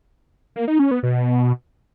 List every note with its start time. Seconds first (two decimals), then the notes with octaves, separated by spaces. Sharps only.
0.56 A#3
0.68 D#4
0.79 C#4
0.91 B3
1.03 B2